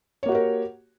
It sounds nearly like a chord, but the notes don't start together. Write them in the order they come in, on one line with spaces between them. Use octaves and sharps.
C#5 A#3 F#4 G4 A#4